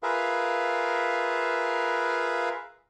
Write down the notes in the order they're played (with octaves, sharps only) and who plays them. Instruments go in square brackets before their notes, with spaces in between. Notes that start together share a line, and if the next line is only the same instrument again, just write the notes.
[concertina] F4 G#4 A#4 B4 E5 F5